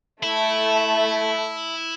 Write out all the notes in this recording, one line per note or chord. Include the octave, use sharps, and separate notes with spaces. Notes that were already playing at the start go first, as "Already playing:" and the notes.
A3 E4